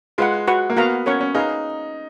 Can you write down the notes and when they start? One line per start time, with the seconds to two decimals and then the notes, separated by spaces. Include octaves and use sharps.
0.18 G#3 F4 B4 F#5
0.47 F#4 B4 F#5 C#6
0.70 A#3
0.77 B3 F#4 A#4 F5 A#5
1.06 C#4 A#4 C#5 F#5 C#6
1.21 C#4
1.35 D#4 G#4 B4 F5 A#5